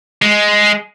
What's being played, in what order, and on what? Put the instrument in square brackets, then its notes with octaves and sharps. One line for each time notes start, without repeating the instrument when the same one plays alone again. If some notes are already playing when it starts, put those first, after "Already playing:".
[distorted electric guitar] G#3